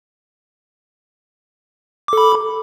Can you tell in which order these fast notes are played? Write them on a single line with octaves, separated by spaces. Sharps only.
D6 A4 B5